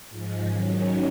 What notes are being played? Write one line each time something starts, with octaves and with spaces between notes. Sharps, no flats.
G#2 F3 G#3
D#3 F#3 C#4